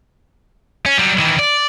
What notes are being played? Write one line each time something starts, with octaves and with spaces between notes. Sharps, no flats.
C#4
F#3 G3
D#3 E3
D5